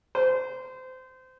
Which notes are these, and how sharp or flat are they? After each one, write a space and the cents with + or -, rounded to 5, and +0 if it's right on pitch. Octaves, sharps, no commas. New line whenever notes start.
C5 -25